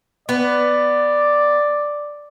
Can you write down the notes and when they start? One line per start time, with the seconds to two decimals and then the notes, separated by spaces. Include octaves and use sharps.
0.29 B3 D5